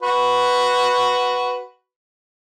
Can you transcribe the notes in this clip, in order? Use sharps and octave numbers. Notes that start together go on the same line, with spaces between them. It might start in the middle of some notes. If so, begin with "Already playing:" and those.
F#4 B4